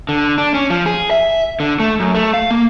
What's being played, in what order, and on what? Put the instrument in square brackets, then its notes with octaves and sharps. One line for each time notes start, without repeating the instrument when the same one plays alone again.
[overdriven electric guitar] D3
D4
C#4
F3
G#4
E5
D3
A3
F#2
A3
F5
A#3